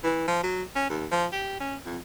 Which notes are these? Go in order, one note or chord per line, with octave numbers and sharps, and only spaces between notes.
E3
F3
F#3
C#4
D#2
F3
G4
C#4
F2